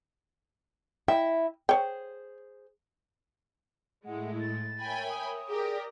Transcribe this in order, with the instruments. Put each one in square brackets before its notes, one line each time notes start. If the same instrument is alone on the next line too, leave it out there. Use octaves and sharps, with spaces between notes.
[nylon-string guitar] E4 D#5 E5 [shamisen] G5
[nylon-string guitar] G#4 C5 [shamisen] C#5 G5
[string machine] A2 A3 E4 [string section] G#3 [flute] F#5
[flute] A6
[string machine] A#4 C#5 E5 [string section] G5 G#5 B5
[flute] D#6
[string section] G4 A#4 [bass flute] G#4 [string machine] D5 A#6